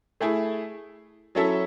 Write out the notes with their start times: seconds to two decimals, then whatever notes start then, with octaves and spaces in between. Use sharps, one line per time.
0.20 A3 E4 G#4
1.35 F#3 C#4 E4 A4 E5